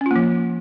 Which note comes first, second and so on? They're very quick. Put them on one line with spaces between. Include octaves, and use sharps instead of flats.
C#4 F4 A#3 F3